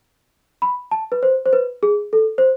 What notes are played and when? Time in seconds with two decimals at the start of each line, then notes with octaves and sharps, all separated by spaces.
0.62 B5
0.91 A5
1.12 B4
1.23 C5
1.46 C5
1.53 B4
1.83 G#4
2.13 A4
2.38 C5